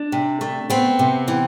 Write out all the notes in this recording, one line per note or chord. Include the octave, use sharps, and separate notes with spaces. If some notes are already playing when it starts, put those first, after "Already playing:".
Already playing: D4
C3
A3
B3 C4
C3
E3